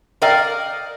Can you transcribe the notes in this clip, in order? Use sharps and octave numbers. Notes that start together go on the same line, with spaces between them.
A#4 D5 D#5 F5 G5